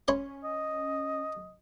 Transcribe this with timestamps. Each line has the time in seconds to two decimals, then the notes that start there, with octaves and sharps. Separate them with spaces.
0.08 C#4 C#5 B5 C6
0.44 D#5